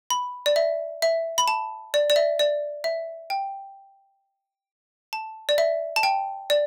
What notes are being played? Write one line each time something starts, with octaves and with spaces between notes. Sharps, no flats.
B5
D5
E5
E5
B5
A5
D5
D5
E5
D5
E5
G5
A5
D5
E5
A5
G5
D5